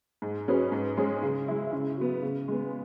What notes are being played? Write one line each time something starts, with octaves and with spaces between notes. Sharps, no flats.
G#2
F#3 C#4 G#4 B4
G#2
G#3 C#4 G#4
C#3
G#3 E4
C#3
F#3 B3
C#3
G#3 B3